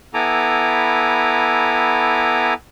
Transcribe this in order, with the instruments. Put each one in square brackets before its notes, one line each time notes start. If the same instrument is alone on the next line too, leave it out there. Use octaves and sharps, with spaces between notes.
[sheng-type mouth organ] B3 E4 A4 G#5 A#5 D6